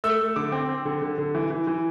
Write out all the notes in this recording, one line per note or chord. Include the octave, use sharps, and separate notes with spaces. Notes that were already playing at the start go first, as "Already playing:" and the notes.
A3 E6
A3
D3 D6
C4
C4
D3
D3
D3
E3
E3
E3